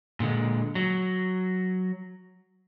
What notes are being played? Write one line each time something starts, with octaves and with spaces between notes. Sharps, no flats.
A#2 D3 G#3
F#3